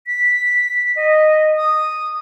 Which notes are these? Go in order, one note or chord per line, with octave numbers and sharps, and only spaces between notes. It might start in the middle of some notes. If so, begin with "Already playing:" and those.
B6
D#5
D#6